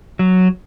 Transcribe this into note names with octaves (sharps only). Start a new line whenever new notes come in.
F#3